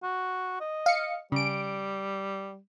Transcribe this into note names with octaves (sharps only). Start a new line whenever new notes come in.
F#4
D#5
F5 C#7
C#3 G3 D7